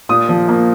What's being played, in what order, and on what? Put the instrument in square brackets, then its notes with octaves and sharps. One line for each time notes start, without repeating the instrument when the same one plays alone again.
[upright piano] A#2 D#6
F3
A#3